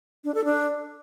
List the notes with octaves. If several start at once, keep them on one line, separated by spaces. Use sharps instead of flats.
D4
A4
D4